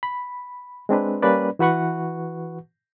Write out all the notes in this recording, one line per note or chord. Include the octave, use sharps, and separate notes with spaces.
B5
G#3 C4 D4 B4
G3 A#3 C#4 B4 D5
E3 F#4 B4 F#5 C#6